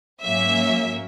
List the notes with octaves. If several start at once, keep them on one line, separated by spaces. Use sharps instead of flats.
G#2 F#3 A#3 C#4 E5